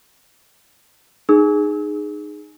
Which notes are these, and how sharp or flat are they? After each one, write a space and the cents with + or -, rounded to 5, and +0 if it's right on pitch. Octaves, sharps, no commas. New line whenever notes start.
D#4 -25 G#4 +0 E6 -40